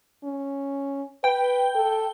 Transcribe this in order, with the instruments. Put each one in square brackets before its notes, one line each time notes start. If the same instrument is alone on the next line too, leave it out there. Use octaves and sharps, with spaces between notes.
[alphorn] C#4
[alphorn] B4 [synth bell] G5
[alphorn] A4